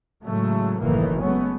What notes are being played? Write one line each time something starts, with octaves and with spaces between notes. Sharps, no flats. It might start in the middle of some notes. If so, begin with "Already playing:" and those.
A2 C#3 F#3 G#3 A3
F#1 B1 A2 D#3 E3 A#3
F#3 G#3 A3 B3 C#4